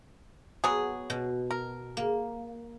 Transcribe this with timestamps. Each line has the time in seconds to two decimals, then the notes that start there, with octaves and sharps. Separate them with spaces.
0.64 F#3 B3 G#4
1.10 B2
1.51 A#4
1.97 A#3